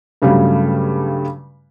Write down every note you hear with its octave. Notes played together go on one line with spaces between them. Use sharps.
G2 C#3 F#3 G3 A3